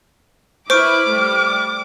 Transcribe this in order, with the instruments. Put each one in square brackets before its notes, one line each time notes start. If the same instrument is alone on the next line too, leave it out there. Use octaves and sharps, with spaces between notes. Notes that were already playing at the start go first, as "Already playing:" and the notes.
[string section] E4 B4 [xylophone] C5 C#6 D7 [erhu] D6 [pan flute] F6
[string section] G3 A3